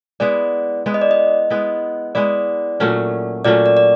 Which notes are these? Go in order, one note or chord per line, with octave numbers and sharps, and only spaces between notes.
G#3 B3 E4 D5
G#3 B3 E4
D#5
D5
D#5
G#3 B3 E4
G#3 B3 E4 D5
A#2 F#3 A3 C#4
A#2 F#3 A3 C#4 D5
D5
D5